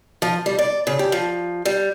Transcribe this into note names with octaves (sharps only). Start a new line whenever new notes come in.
F3
G3
D5
C#3
G4
F3
G3